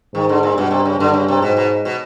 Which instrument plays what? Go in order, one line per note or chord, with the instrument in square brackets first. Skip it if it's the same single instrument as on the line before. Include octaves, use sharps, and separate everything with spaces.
[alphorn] G#2 [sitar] D#3
[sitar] D3
A#2
[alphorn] G2 [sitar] B2
[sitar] C3
C#3
[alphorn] G2 [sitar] D3
[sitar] C#3
C3
[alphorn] G#2 [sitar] B2
[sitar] B2
B2